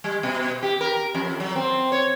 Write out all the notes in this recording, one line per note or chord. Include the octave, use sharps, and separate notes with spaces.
G3
B2
G4
A#4
F2
F#3
C4
C#5